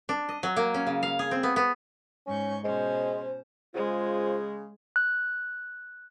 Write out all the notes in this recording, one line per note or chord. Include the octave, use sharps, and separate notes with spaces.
D4
D#5
F#3
A#3
C#4
C#3
F5
G#4
C4
B3
B3
G#2 C#4 C#6 G6
B2 G#3 C#4 C5
C#3 G#3 F4 C5
F#6